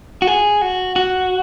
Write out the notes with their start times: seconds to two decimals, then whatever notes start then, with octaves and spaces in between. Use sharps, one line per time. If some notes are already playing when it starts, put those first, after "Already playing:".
0.22 F#4
0.27 G#4
0.62 F#4
0.96 F#4